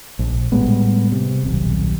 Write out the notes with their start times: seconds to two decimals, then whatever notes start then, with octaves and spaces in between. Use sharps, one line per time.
0.19 A#1
0.52 A2 G3 G#3 B3
1.12 C3
1.44 D#1 B1